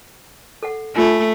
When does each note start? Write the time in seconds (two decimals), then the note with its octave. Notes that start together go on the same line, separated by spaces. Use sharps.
0.63 A4 F#5
0.96 A3 D4 F4 B5